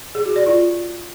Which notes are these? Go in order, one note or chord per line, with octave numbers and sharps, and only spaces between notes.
G#4
F#4
D5
F4